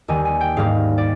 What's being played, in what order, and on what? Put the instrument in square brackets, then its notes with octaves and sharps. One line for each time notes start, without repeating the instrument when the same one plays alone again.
[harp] D#2 D#3 G3 G#5
G#5
G5
G#2 G3 A#3 F5
D5